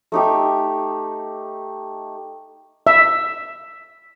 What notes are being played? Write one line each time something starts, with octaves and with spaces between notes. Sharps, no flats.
A3 D#4 G4
E5